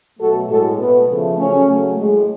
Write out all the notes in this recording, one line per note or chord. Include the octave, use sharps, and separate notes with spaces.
B2 F#3 A3 F#4 A4
A2 G#3 F#4 A4
B2 A3 B3
C#3 F3 A3
C#3 F#3 A3 C#4
C#3 F#3 A3
A2 G#3